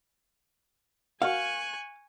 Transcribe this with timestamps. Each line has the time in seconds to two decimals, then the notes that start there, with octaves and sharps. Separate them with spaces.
1.22 F#4 A#4 F5 F#5 G#5 C#6 F#6